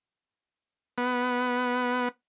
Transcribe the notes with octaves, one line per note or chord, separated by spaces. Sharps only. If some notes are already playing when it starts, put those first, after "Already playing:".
B3